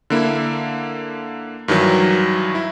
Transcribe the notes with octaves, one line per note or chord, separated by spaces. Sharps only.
D3 A#3 E4
G2 D#3 E3 F#3
E4